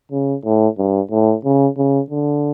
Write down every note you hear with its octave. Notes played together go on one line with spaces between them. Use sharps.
C#3
A2
G2
A2
C#3
C#3
D3